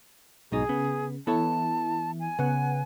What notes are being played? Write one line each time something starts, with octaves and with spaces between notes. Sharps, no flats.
B1 G#2 B2 D#4 G#4
C#3 B3
E3 B3 E4 A4 C#5 A5
G#5
C#3 B3 F#5